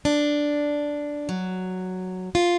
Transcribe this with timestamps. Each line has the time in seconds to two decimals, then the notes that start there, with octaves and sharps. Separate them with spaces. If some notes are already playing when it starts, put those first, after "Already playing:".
0.05 D4
1.29 F#3
2.35 F4